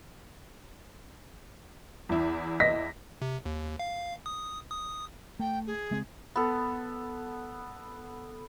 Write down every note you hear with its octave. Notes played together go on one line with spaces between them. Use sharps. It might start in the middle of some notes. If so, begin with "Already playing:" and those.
E2 E4
D#5 A#6 B6
C3
D#2
F5
D#6
D#6
A3 G5
G#4
C#3 G#3 C4
B3 A4